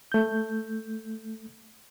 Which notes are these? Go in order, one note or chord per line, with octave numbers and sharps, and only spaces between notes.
A3 G6